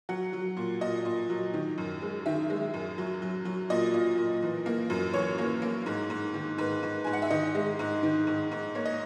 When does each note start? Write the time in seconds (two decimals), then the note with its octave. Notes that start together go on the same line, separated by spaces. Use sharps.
0.09 F#3 F#5
0.33 F#3
0.57 A#2
0.81 A#2 D#5
1.05 A#2
1.30 F#3
1.54 D#3
1.78 F#2
2.02 G#3
2.26 D#3 E5
2.50 G#3
2.74 F#2
2.98 F#3
3.22 F#3
3.45 F#3
3.70 A#2 D#5
3.94 A#2
4.18 A#2
4.43 E3
4.66 A#3
4.90 F#2
5.14 E3 C#5
5.38 A#3
5.62 A#3
5.86 G#2
6.10 G#2
6.34 D#3
6.58 G#2 B4
6.83 G#2
7.04 G#2 G#5
7.13 F#5
7.22 E5
7.30 D#3 D#5
7.55 G#3
7.79 G#2
8.03 D#3
8.27 G#2
8.51 G#2
8.75 A#3 C#5
8.86 D#5